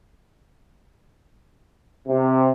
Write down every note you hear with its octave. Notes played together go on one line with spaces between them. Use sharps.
C3